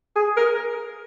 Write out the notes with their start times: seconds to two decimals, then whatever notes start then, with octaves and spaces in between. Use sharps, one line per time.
0.16 G#4
0.37 A#4